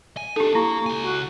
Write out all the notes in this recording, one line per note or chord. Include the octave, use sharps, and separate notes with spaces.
G#5
D4 D#4 G4 A4 A5
A#3 E4 C#6
C#2 G#5
F#4